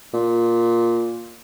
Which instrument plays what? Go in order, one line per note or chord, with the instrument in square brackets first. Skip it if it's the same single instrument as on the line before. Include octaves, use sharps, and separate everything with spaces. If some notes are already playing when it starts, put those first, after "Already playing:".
[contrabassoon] A#2